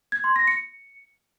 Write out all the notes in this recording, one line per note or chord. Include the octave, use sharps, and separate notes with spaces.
G#6
C6
A#6
C#7